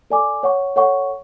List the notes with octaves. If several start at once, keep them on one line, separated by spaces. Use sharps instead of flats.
A4 D5 G#5 D6
C#5 F#5 C#6
A4 C#5 F#5 C#6